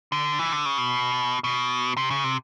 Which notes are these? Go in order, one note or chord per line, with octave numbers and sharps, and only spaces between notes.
D3
E3
D3
C#3
B2
B2
C3
C#3
C3